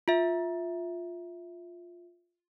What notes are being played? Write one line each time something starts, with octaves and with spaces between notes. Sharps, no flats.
F4 E5